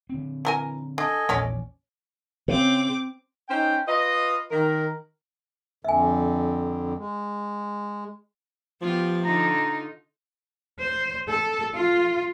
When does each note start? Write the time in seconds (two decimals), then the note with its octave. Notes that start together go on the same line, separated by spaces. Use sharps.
0.10 D3 C4
0.45 E3 A#4 G#5
0.98 D4 A4 D#5 G#5
1.29 A#1 E2 F3 C#4 C#5 D5
2.48 C#3 C4 D6
3.49 C#4 D#4 C5 G5
3.87 F4 B4 D#5
4.50 D#3 A#4
5.85 F2 D3 E5 G#5
6.97 G#3
8.82 F3 B3 F4 G4
9.25 D3 D#4 F4 A#5
10.81 C5
11.29 A4
11.74 F4